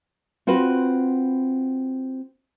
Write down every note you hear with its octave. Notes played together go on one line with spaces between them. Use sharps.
C4 F4 F#4 B4